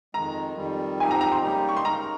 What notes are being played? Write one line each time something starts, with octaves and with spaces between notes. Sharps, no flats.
F2 D#3 G#3 A#5
F2 D#3 G3
G#2 F3 C4 D#4 G4 G#5
A#5
A#5
C6
C#3 G3 A#3 D#4 G4
C#6
C6
C#3 G#3 D#4 A#4 A#5